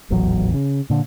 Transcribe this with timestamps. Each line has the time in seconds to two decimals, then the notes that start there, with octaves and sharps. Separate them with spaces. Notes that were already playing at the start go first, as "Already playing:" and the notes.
0.10 D#1 A1 E2 F#3
0.54 C#3
0.90 A#2 D3